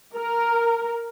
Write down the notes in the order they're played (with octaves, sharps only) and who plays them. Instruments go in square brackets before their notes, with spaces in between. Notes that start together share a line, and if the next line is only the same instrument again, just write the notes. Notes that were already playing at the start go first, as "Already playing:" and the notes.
[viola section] A#4